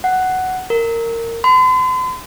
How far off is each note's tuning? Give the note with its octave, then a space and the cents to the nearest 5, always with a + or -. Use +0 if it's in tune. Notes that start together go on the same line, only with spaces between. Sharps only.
F#5 +5
A#4 -20
C6 -45